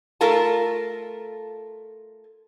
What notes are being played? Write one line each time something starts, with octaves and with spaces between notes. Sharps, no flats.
A3 F4 A4 A#4 A5